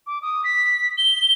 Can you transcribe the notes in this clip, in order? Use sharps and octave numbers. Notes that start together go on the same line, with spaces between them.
D6
D#6
B6
G7